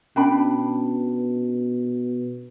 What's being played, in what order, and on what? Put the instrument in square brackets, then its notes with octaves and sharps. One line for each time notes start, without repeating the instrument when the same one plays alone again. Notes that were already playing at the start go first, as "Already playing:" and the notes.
[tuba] B2 [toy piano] C#4 [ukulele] D4 G5 B5